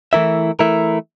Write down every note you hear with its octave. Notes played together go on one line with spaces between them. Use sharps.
E3 A3 E4 A#4 E5
E3 A3 E4 A#4 E5